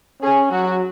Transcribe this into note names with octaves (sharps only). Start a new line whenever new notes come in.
C#4 G#4
F#3 F#4